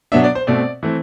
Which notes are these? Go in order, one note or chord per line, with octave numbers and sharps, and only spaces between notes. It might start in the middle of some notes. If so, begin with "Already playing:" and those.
B2 F#3 B3 D4 E5
D5
C5
B2 A3 C4 D5
E3 A3 C4